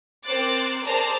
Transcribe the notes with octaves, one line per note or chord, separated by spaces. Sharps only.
C4 A#4 C5 D6 F#6 A6
G#4 A#4 C5 D5 A5 A#5